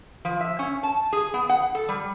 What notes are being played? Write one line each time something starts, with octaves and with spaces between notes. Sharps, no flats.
F3
E5
C#4
A5
G#4
B3
F#5
A4
G3